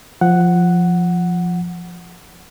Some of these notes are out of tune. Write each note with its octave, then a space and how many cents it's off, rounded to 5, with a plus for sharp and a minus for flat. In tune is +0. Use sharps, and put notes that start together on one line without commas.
F3 +0 F#5 +0